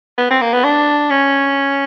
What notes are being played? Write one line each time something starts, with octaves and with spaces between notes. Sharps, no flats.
B3
C4
A#3
B3
D4
C#4